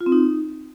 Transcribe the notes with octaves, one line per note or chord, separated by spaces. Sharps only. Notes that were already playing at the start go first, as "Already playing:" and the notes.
F4
C4
D#4